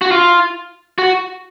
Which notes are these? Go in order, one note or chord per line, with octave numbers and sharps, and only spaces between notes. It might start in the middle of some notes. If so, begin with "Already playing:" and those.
F#4
F4
F#4